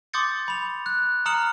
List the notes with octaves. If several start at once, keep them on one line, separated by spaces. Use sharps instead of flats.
C6 D6 D#6 G6 A6 C#7
B5 F7
F#6
A#5 D#6 F6 C#7 E7 F#7